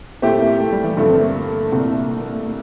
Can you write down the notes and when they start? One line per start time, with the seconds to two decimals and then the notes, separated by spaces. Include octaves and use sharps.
0.22 A#2 A3 C4 E4 G4
0.41 A#3
0.60 A3
0.73 G3
0.84 E3
0.97 G2 D3 F3 A3
1.10 C4
1.21 A#3
1.35 A#3
1.72 C2 A#2 A3
2.22 A#3
2.34 A3
2.47 A#3